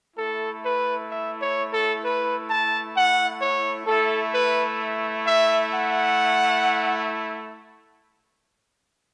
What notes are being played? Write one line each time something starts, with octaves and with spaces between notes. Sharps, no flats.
A3 E4 A4
B4
E5
C#5
A4
B4
A5
F#5
C#5
A3 E4 A4
B4
E5
F#5